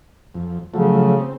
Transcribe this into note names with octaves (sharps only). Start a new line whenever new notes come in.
F2
C#3 F3 F#3 A3
C4